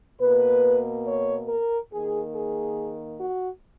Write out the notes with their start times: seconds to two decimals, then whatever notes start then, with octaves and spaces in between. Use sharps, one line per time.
0.21 B2 A#3 B4
1.06 C#5
1.49 A#4
1.91 D#3 A#3 G#4
2.34 G#4
3.19 F#4